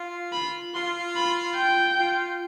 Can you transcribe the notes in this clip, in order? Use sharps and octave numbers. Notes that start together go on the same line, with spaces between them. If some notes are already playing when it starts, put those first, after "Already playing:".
Already playing: F4
B5
F4 C6
B5
G5
F4